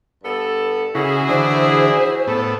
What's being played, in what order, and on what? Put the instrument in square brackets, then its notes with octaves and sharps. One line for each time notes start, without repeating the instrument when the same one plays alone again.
[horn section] G2 B3 A4
[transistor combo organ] C#3 [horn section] E4 F#4 G#4
[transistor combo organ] D3 E3 D4 [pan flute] C5
[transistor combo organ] A2 B3 [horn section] A4